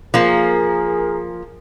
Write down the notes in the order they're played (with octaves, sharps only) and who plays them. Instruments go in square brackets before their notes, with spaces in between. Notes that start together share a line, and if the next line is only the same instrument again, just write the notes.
[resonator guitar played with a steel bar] F3 A#3 [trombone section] G#4 A#4